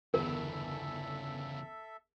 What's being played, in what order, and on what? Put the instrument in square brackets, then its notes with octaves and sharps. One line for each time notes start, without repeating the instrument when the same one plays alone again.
[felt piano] G1 E2 [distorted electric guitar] C#3 E3 [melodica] A4 E5 [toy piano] A#4